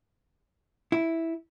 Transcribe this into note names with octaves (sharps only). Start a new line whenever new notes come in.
E4